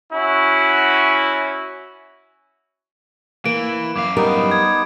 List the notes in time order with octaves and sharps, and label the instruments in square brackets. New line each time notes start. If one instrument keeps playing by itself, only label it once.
[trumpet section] C#4 E4 F#4
[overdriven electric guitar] E3 [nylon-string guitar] A#3 [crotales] D7
[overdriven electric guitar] F#2 F5 [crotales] D6
[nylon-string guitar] G3 A#4 [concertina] B3 D#4
[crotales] G#6